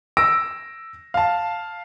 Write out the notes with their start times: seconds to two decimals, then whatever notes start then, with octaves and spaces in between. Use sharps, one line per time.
0.17 E6 A#6 D7
1.14 F5 A5